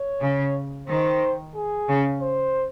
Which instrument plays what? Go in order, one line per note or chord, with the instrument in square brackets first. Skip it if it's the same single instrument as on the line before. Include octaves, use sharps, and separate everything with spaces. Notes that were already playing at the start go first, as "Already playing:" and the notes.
Already playing: [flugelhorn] C#5
[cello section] C#3
[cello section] D#3 [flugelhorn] C5
[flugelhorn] G#4
[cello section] C#3
[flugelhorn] C5